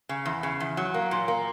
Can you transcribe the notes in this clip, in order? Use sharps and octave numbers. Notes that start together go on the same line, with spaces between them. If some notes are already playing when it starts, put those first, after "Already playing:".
C#3
E2
C#3
E2
F#3
A#3
A#2
A#3